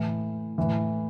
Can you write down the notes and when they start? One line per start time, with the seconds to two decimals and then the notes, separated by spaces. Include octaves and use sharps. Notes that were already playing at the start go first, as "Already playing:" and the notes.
Already playing: A2 E3 B4 B5
0.58 A2 E3